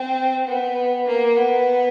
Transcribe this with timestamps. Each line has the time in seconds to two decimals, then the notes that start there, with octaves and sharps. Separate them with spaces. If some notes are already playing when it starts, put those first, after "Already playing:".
Already playing: C4
0.46 B3
1.07 A#3
1.36 B3